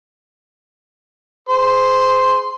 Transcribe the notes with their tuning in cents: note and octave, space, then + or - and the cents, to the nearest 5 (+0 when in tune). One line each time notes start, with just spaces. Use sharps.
G#4 +10 C5 -20 C6 +0